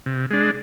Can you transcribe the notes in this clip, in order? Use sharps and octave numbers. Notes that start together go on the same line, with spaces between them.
C3
G#3 D4